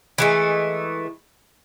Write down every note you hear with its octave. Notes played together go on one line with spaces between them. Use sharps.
E3 G#3 A3